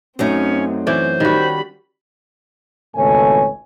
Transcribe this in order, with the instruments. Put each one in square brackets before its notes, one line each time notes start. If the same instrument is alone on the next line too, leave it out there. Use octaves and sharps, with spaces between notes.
[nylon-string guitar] F#2 A3 D#4 [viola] C4 [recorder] C#4
[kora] E3 C#4 D5 [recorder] C5
[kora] D#3 F#4 [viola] G3 B5
[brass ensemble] G#1 C#2 B2 A3 C#5 G#5